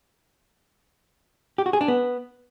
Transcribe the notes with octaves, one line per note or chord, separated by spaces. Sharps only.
G4
F#4
G#4
D4
B3